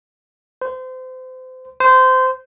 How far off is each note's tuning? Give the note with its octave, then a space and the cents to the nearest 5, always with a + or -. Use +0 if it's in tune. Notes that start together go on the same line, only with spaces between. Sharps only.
C5 -30
C5 -20